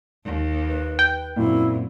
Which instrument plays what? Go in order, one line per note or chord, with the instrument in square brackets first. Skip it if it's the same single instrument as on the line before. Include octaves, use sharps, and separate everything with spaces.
[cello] D#2
[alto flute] B4
[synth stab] G5
[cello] F#2 [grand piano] A#2 C4 [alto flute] E4